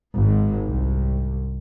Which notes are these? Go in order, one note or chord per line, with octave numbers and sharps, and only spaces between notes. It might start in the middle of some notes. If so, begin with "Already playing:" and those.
G#1 G#2
C2